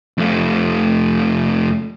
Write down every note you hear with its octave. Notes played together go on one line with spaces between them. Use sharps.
F2 A3